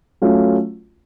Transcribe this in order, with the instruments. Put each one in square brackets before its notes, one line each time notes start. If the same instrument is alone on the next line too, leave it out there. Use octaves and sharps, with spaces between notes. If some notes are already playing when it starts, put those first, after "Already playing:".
[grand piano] F#3 A3 C#4 F4